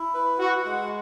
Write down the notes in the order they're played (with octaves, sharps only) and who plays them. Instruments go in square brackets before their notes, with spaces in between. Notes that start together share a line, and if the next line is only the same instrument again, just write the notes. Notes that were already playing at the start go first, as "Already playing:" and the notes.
Already playing: [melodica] E4
B4
[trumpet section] F#4 [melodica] F#5
[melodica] G#3